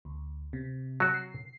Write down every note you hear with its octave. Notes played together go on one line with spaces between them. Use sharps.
D2
C3
F#3 F#4
C7